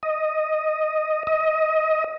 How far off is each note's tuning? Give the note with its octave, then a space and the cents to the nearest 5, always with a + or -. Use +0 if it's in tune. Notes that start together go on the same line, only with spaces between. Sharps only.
D#5 +0
D#5 +20